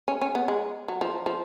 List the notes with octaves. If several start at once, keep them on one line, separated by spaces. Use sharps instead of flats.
C#4
C#4
B3
G#3
F#3
F3
F3